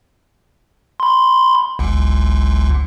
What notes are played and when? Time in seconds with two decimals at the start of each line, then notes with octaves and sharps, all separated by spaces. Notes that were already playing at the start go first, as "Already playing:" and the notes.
1.00 B5 C6
1.79 G1 C#2